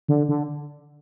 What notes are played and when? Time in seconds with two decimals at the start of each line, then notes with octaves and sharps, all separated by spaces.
0.08 D3
0.29 D3